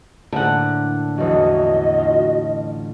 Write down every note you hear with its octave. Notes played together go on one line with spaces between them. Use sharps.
A2 D3 A#3 C4 F#5
A1 E2 F#3 F#4 D#5
F4